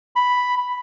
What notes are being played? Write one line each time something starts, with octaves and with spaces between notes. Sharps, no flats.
B5